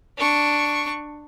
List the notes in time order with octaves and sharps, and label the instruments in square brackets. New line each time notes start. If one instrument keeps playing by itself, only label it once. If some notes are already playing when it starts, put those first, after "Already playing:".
[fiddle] D4 C#6